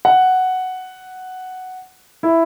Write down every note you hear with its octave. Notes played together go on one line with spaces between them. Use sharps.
F#5
E4